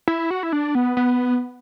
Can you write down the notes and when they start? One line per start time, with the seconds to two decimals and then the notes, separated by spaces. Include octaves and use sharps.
0.08 E4
0.30 F#4
0.43 E4
0.53 D4
0.75 B3
0.97 B3